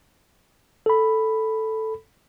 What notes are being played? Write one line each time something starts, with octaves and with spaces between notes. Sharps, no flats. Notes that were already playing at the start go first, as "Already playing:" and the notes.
A4 B5